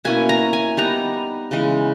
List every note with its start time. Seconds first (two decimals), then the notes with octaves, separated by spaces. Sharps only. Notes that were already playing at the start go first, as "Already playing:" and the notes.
0.05 B2 A#3 C#4 E4 G#5
0.29 A#5
0.53 G#5
0.77 G3 B3 D#4 A#5
1.51 C#3 E3 G#3